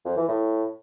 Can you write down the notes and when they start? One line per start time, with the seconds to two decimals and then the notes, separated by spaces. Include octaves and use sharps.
0.05 F2
0.17 E3
0.29 A2